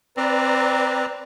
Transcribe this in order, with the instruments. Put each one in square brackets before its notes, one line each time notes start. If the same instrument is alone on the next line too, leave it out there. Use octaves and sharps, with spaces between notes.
[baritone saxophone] C4 [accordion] B4 D5 A#5